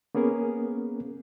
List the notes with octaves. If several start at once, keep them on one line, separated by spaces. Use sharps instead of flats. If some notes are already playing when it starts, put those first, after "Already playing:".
A#3 B3 C#4 G#4 A#4